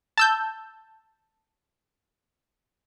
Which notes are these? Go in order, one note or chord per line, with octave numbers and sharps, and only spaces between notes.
A5 E6 G6